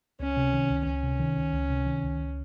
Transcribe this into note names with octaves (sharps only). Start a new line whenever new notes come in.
C#2 C#4
C3
D#3
C#2
C#2 C#4
C3
D#3
C#2
C#2
C3
D#3
C#2
C#2